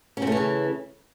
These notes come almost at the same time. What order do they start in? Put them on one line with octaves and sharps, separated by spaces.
C#4 C4 A3 E3 C#3